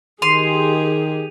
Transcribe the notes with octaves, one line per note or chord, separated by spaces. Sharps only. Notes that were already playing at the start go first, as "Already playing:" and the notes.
D#3 G4 G#4 C6 D#7 F7